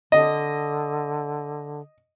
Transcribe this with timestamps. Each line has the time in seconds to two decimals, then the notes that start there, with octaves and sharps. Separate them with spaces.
0.12 D3 D#5